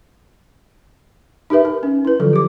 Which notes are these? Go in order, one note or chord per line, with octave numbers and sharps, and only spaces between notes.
D#4 G4 A#4 B4 E5
A#4
C#4
E4 B4
D3 F3 F#3 F4 A4
G4 D6